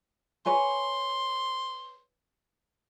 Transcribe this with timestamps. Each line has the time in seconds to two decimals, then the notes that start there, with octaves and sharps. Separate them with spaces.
0.46 G#4 B4 C#5 C6